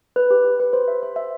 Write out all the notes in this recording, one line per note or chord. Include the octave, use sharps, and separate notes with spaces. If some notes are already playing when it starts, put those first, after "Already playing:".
B4
G4
G4
B4
C5
E5
C5
E5